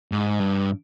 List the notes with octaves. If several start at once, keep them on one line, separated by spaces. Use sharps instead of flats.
G#2
G2